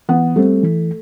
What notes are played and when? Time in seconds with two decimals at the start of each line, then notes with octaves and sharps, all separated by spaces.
0.09 E3 B3
0.36 G3 A3 C4
0.63 E3